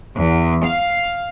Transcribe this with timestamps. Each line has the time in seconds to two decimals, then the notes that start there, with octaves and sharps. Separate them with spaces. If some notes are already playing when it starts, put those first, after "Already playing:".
0.16 E2
0.64 F5